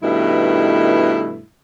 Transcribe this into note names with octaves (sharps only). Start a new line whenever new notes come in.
G2 B2 D#3 A3 E4